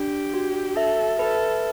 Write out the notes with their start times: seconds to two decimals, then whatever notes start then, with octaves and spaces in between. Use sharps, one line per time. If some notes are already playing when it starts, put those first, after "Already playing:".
Already playing: D4 G4
0.34 F#4
0.76 A4 E5
1.19 A4 B4